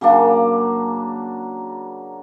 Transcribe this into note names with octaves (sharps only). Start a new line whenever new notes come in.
C#3 F#3 A#3 D4